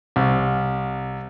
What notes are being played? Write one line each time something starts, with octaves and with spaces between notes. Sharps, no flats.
C2